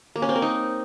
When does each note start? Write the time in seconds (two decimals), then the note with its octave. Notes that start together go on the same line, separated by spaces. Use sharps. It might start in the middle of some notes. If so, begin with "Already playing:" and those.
0.16 A#3
0.22 C#4
0.29 C4
0.36 A#4
0.42 D#4